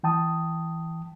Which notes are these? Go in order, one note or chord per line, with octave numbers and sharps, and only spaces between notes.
E3 G5 A5 D#6